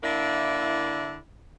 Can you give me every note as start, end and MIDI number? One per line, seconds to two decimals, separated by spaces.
0.03 1.20 50
0.03 1.20 58
0.03 1.20 62
0.03 1.20 64